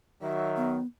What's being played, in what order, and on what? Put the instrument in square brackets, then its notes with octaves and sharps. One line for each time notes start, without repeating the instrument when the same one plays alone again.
[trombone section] D#3 F#3 [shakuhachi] E5
[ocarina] B3